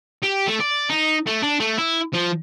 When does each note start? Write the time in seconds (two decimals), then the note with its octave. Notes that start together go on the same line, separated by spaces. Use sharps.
0.23 G4
0.48 A3
0.61 D5
0.90 D#4
1.27 A3
1.43 D4
1.60 A3
1.78 E4
2.13 F3